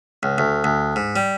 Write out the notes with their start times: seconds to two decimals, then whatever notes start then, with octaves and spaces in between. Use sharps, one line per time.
0.23 C#2
0.38 D2
0.64 D2
0.96 G#2
1.16 G3